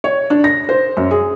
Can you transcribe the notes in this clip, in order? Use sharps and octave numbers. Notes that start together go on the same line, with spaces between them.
C#5
D4
A#6
C5
F#2
G#4